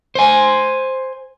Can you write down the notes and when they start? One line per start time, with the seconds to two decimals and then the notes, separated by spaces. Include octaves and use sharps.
0.15 C5 G#5